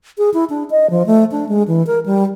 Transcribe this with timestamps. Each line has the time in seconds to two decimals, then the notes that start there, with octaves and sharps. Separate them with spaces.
0.18 G#4
0.34 E4
0.50 D4
0.70 D#5
0.90 F3
1.06 A3
1.32 D4
1.49 G#3
1.67 E3
1.87 A#4
2.06 G3